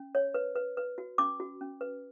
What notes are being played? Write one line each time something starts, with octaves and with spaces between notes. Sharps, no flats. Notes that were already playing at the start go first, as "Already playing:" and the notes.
Already playing: C#4
C#5
B4
B4
B4
F#4
C#4 D6
F#4
C#4
B4